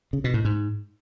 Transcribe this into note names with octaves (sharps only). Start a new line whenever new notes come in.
C#3
B2
A2
G#2